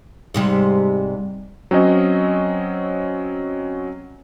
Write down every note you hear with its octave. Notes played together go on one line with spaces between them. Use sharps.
G#2 C3 G3
F#3 C4 C#4 D#5